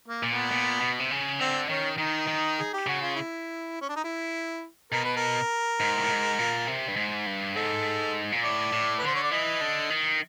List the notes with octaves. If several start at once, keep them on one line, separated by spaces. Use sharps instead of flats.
A#3
A#2
B3
A#2
B2
C3
C#3
D3 C4
D#3 C#4
D#3 D#4
D#3
G#4
G4
C#3 F#4
F4
E4
C#4
D4
D#4
E4
B2 A#4
B4
A#4
G#2
A2
G#2
A#2
C3
G2
G#2
G2
G#2 A4
A#2
A2 D5
A2
B4
D3 C5
C#5
D5
E3 D#5
D3
D#3